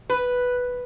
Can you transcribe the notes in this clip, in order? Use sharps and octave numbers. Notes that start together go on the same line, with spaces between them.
B4